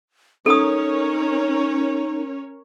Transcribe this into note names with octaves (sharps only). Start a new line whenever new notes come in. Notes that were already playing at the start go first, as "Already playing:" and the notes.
C#4 D#4 A4 A#4 C#5 D#6